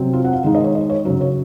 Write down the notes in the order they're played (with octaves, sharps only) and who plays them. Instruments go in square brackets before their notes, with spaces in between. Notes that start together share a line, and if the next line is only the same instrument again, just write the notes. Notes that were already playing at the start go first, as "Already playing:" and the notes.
Already playing: [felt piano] C3 F#3 C4
F4
F#5
F5
D#3 G#3 D#4 F5
D#5
C#5
D#5
C#5
F#2 C#3 F#3 C#5
C#5